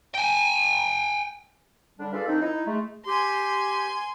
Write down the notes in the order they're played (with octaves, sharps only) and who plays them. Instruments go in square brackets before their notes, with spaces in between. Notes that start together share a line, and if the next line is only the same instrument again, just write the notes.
[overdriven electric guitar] G5 G#5
[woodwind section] D3 G3 D4
F4 G#4 A4 B4 D5 F5
D#3 F3 C4 D4 D#4
D#4 E4
G#3 A3
[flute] G4 [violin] G#5 C6